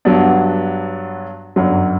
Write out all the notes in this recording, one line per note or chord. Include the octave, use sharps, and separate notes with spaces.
G2 F#3 B3 D4
G1 F#2 F#3